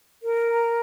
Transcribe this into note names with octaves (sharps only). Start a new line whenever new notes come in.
A#4
A#5